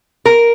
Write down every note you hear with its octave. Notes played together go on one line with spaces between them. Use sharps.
A#4